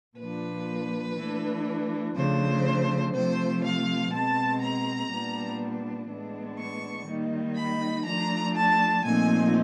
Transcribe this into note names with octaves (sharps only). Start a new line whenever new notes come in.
A#2 F3 A#3 D4 B4
E3 A3 D4
C#3 F3 A3 D4 C5
C3 F3 A3 C5
F5
B2 G#3 C4 A5
A#5
A#2 G3 B3 D4
A2 E3 G#3 B3 D4
C#6
D#3 G3 A#3 D#4
B5
F3 A3 D4 A#5
A5
A#2 F3 A3 C4 D#4 G#5